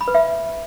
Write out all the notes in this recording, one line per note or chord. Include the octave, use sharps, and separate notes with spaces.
B5
B4
E5